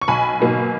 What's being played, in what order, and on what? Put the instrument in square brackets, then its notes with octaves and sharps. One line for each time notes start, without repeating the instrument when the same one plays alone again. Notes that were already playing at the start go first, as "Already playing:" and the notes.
[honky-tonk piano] C#6
B1 G#5 B5
B2 F#3 A#3 D#4